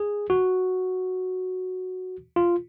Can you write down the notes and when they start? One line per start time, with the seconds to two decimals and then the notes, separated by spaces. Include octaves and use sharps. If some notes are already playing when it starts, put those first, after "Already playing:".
Already playing: G#4
0.30 F#4
2.36 F4